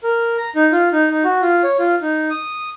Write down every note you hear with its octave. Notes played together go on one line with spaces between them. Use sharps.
A#4
A#5
D#4
F4
D#4
D#4
F#4
F4
C#5
F4
D#4
D#6